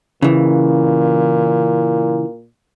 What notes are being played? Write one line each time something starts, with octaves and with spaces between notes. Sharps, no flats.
A#2 C#3 E3